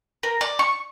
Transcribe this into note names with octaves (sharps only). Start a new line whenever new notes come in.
A#4
D5
C#6